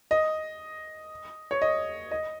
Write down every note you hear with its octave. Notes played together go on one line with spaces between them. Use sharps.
D#5
C#5
D#5
D#5